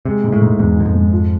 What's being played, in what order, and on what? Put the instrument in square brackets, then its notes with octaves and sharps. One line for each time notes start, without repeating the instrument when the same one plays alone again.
[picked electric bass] C3 [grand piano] G#3
[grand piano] G#2
[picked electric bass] A2
[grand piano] G#2
[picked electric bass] E2 [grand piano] G#2
[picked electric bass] E2 [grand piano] G#2
[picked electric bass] F2
[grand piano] G#2
F3